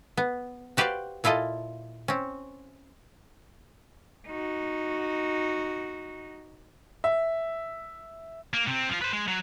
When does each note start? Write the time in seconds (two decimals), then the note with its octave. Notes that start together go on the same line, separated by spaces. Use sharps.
0.17 B3
0.77 F#4 G4 B4 C5 D5 F5
1.24 A#2 E4 F4 A4 D#5
2.08 C4 C#4
4.28 D#4 F#4
7.04 E5
8.54 A#3
8.67 C3 C4
8.89 F3 F4
9.02 B4 C5
9.13 G#3
9.28 F#3